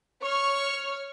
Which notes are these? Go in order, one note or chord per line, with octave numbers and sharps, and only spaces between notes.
C#5 C#6 F6